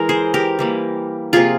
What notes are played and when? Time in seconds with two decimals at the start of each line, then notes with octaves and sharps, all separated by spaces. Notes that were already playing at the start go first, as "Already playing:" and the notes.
Already playing: E3 G#3 A#4
0.09 G#4 C5
0.34 G4 A#4
0.59 E3 G3 A#3
1.33 C3 F3 A#3 F4 G#4